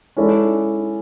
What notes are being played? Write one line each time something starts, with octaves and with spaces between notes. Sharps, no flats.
G#3 C#4 E4 A4 D5